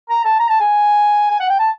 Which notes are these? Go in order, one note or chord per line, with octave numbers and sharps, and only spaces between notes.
A#5
A5
A#5
A5
G#5
G#5
F#5
G5
A5